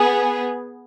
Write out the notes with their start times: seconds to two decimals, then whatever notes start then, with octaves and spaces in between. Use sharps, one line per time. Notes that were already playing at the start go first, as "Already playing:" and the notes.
Already playing: B3 G#4